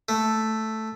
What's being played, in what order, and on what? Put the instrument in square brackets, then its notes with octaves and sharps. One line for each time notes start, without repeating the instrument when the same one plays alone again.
[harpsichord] A3